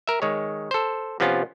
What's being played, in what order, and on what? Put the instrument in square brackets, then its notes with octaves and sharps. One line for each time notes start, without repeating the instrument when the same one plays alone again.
[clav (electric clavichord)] A#4 E5
D#3 G#3 C#5
A4 C5
C3 F3 B3 C#4 F4